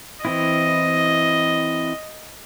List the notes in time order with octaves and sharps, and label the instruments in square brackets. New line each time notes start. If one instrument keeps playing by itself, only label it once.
[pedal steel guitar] E3 C4 E4 [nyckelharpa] D#5